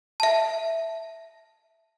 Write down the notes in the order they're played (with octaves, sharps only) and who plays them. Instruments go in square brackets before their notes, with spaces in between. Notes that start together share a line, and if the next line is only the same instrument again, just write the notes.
[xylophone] E5 A5